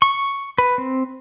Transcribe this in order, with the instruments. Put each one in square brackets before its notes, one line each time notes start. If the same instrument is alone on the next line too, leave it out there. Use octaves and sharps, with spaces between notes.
[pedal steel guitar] C#6
B4
C4